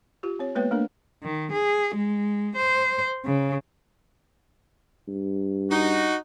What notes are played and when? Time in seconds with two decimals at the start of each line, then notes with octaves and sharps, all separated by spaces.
0.23 F4 G4
0.39 C4 C#5
0.55 G#3 A#3 B3 B4 C#5 G5
0.71 A3 A#3 D4 A#4
1.23 D#3
1.52 G#4
1.95 G#3
2.56 C5
3.25 C#3
5.08 G2
5.70 D#4 F#4